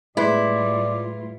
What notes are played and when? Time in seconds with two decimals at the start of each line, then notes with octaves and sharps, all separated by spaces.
0.17 A2 G3 G#3 E4 F4 B4 D5 C6